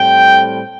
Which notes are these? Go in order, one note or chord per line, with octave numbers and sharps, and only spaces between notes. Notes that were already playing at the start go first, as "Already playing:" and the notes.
Already playing: A2 G3 C4 G5